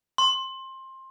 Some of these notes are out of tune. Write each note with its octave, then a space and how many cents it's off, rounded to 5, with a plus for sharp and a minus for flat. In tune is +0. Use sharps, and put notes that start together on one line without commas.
C6 +20